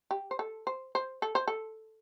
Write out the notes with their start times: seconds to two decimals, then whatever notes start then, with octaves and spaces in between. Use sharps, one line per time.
0.11 G4
0.31 C5
0.39 A4
0.67 C5
0.95 C5
1.22 A4
1.35 C5
1.47 A4